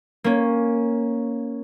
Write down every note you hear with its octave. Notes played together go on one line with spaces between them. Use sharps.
A#3 C#4